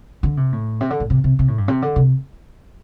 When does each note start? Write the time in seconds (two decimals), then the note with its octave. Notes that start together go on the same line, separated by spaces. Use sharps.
0.23 D3
0.37 C3
0.52 A2
0.81 C3
0.90 D3
1.00 A2
1.10 C3
1.24 C3
1.39 C3
1.48 A2
1.58 G2
1.68 C3
1.82 D3
1.96 C3